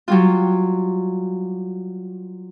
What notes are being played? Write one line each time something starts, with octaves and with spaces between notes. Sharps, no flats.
F#3 G3 F4